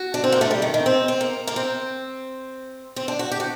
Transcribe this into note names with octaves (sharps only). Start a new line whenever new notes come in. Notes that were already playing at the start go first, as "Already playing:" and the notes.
Already playing: F#4
D4
C4
A#3
A3
G3
D#3
D#3
C4
C4
A#3
A#3
C4
C4
D4
F#4
G4
F#4